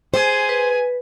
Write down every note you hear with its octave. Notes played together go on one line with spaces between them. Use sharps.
G#4 C5 G#5
B4